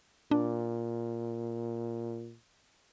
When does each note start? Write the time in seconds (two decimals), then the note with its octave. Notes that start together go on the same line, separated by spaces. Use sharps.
0.31 A#2 D4